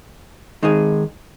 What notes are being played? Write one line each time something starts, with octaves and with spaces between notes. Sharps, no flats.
D#3 G#3 D#4 G#4